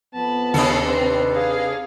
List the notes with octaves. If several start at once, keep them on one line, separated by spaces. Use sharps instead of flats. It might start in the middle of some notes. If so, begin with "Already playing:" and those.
F2 B3 A5 B5
D#2 C3 D4 A4 D#6
C4 D#4 B4 C6
G#4 F5